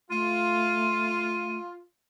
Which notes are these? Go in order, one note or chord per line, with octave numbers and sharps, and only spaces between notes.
A3 F4 D#7